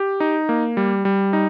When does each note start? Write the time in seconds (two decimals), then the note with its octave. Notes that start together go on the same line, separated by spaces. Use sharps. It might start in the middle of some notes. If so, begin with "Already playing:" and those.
Already playing: G4
0.20 D#4
0.49 A#3
0.77 G3
1.05 G3
1.33 D#4